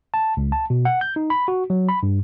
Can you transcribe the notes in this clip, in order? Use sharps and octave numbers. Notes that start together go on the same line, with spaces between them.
A5
C#2
A5
B2
F#5
G6
D#4
B5
F#4
F#3
B5
G2